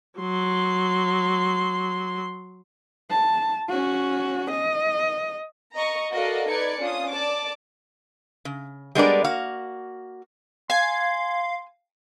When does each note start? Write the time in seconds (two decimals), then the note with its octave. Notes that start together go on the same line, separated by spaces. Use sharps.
0.19 F#3 C6
3.11 A5
3.69 C#4 F#4
4.51 D#5
5.76 D#5 A#5 C#6
6.13 F#4 A4 A#4 D5 D#5 F5
6.50 D#4 B4 D5 G#6 C#7
6.81 C#4 D4 F4 D#6
7.14 D5 A5 D6
8.45 C#3
8.95 G3 G#3 B3 D4 A#4 D5
9.24 A#3 F#4 F5
10.70 F5 G#5 C6